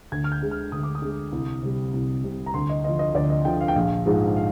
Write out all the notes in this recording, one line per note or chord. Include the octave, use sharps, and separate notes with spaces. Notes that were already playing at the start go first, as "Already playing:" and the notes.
D2 G#6
F6
G6
D3 G#3
F6
D2 D#6
D6
D#6
D3 G#3
C2
C3 G3
C2
C3 G3
A#5
D2 C6
D#5
D3 F3 D#5
D#5
D2 D5
D#5
D3 F3 G5
F5
G5
A#1 F5
G#2 F3 G#3
F5